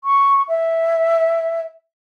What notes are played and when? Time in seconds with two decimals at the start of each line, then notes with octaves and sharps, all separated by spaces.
0.04 C#6
0.48 E5